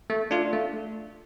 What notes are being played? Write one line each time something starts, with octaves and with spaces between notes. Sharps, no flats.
A3
D4 F4
A3